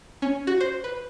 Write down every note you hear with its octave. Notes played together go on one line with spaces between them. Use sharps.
C#4
F#4
C5
B4